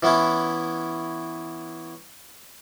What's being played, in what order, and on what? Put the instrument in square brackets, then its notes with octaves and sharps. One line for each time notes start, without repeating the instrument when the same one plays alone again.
[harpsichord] E3 B3 C#4 E4